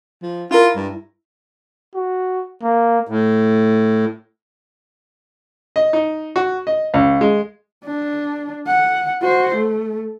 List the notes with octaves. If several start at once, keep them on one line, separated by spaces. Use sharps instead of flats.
F3
E4 F4 A#4
G2
F#4
A#3
A2
D#5
D#4
F#4
D#5
C#2
G#3
D4
F#5
F#4 C5
A3